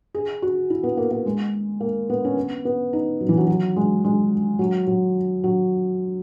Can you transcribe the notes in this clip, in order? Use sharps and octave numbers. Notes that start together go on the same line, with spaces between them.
G#4
F#4
E4
B3
A#3
A#3
G#3
A#3
B3
C#4
B3
B3
D#4
F#3
E3
F#3
F#3
G#3
G#3
F#3
F#3
F#3